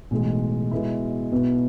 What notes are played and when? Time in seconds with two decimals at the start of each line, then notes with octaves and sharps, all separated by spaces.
0.11 B1 A2 E3 G#3
0.71 B2 G#3 B3 E4
1.31 B1 B2 B3 E4